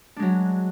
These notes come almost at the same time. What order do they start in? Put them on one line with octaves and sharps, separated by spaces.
D4 G#3 F#3